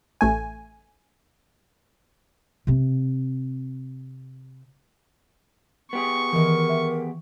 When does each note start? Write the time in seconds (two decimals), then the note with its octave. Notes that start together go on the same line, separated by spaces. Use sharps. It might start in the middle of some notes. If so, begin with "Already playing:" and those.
0.21 A1 A3 G#5
2.67 C3 C4
5.93 B3 G4 G#4 C#6
6.33 D#3 E3 A#4
6.69 E5